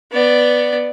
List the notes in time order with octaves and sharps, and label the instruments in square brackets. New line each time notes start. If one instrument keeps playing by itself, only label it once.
[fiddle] B3 D5